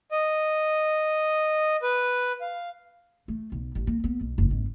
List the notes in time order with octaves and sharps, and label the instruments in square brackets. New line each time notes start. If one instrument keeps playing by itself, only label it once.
[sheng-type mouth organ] D#5
B4
F5
[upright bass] A3
B1
A1
A#3
B3
B1
F#1
G#1